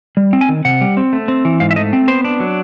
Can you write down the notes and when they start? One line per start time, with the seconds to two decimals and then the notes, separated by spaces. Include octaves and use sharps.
0.17 G3
0.33 C4
0.41 G#5
0.49 D#3
0.65 C3 F#5
0.81 G3
0.97 C4
1.13 A3
1.28 C4
1.45 E3
1.60 G#2 F5
1.71 E5
1.76 A3 D#5
1.93 C4
2.08 B3 C5
2.25 D4
2.40 F#3